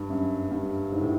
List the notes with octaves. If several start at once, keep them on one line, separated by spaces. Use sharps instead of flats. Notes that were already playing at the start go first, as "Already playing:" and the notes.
Already playing: G2
F#2
G2
G#2
A2